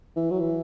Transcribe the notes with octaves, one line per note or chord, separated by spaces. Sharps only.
E3
F#3
E3